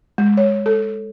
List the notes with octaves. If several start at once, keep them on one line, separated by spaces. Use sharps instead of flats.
G#3
C#5
A4